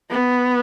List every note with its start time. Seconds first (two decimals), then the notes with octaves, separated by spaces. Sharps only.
0.11 B3